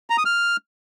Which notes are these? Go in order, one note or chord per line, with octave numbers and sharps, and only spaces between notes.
A#5
D#6
F6